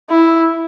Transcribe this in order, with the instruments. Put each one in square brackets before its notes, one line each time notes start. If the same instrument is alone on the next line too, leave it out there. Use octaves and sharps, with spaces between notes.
[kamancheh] E4